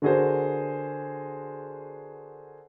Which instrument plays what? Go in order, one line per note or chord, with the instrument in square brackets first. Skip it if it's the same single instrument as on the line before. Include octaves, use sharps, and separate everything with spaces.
[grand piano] D3 F#4 G#4 A#4 C5